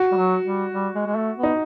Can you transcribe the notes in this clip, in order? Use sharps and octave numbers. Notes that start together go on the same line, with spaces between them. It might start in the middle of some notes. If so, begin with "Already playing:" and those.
Already playing: F#4
G3
F#3
G3
G3
G#3
G#3
A3
B3
D#4